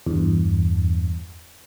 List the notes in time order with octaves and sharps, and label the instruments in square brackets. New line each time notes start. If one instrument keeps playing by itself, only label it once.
[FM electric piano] E2 G2